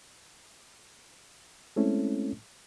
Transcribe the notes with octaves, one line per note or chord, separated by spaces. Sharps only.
G#3 A3 C4 C#4 E4 A4